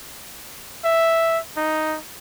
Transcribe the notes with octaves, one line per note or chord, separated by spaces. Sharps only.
E5
D#4